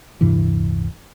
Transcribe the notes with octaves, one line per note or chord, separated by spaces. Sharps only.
D1 G2 C3 E3